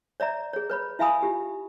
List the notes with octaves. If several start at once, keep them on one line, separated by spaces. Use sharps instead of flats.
C#5 D5 E5 A#5
G#4 C#5
B4 C#5 B5
E4 E5 F5 G#5 B5 D#6
F4 G4